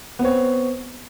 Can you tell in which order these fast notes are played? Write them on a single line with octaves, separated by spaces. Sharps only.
B3 C4 C#5